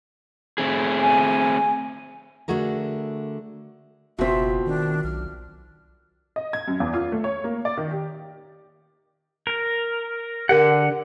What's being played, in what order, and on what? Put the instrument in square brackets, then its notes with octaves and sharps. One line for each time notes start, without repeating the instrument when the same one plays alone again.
[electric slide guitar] A3 C4 G#4
[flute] G#5
[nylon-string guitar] D3 A3 F#4 G#4 A#4
[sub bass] F#1 [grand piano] B2 C4 [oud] F4 F#4 [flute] E5
[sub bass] D#3 [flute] D4
[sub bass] B1 [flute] F6
[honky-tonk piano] D#5
G#6
F#2
E2
F4
A3
C#5
A#3
D5
D#3
G4
[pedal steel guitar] A#4
[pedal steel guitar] D3 F#5 [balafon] G4 A#4